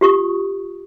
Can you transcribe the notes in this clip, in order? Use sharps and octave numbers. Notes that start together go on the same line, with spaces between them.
F4 G4 C#6 D#6